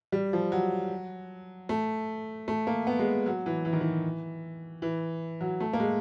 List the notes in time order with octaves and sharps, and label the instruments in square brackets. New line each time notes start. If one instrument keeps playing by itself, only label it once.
[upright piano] G3
F3
F#3
A3
A3
A#3
B3
G#3
F#3
E3
E3
D#3
E3
E3
F#3
A3
A#3
G#3